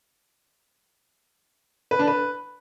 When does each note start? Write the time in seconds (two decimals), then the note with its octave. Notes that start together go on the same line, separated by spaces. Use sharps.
1.91 B4
1.99 D4
2.07 B4